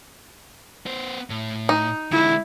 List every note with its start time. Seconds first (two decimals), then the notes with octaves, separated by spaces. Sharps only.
0.86 B3 C5
1.30 A2
1.69 D#4
2.12 D3 G#3 E4